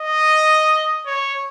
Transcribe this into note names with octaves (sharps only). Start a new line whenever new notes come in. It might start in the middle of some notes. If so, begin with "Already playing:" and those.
Already playing: D#5
C#5